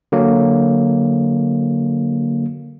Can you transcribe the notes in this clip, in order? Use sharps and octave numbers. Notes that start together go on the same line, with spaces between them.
D3 F#3 A#3